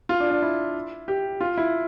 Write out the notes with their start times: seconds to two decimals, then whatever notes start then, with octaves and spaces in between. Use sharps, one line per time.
0.09 F4
0.20 D4
0.30 D4
0.42 E4
1.08 G4
1.41 F4
1.58 E4